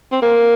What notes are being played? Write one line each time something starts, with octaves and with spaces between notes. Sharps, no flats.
C4
A#3